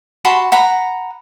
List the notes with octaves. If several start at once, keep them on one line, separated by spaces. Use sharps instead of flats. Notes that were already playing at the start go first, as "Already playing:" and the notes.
F#4 A5 B5 C6
F#5 A#5 B5